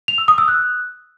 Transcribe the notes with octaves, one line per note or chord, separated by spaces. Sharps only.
F7
E6
D#6
E6
F#6